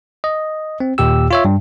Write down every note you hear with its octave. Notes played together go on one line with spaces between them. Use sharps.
D#5
C4
D#2 A#2 G4 E6
F4 C#5 E5
G2